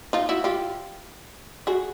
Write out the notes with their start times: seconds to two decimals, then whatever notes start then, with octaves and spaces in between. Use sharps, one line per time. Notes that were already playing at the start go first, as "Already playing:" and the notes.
0.13 D#4 F4
0.29 E4 F#4
0.44 F4 G4
1.67 F#4 G#4